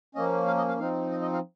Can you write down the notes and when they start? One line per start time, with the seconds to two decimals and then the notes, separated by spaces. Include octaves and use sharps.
0.15 F3 A#3 C#4 D#5
0.47 F5
0.58 D#5
0.68 F5
0.79 F3 C4 D#4 F5
1.11 D#5
1.22 D#5
1.33 F5